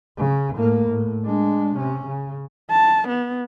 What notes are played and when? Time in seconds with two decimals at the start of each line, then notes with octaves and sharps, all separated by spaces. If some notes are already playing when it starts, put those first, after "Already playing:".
0.17 C#3
0.55 A2 A#3
0.89 A2
1.25 G#3 D4
1.76 C3 C#4
2.07 C#3
2.71 A5
3.08 B3